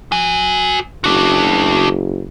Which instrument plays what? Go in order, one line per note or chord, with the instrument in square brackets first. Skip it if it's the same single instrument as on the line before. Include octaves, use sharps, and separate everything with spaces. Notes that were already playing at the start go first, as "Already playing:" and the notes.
[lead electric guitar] F#4 G#5
[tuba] F#1 [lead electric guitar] D4 F#4